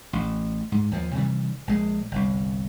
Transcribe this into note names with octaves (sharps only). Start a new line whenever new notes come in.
A1
G#2
D#2 F3
C3 D#3 E3 G3
A#1 G#3
G1 C2